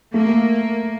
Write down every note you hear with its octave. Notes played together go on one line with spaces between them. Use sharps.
A3 A#3